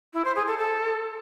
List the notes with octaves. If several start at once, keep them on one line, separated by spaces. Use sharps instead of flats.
E4
C5
G#4
A4
A4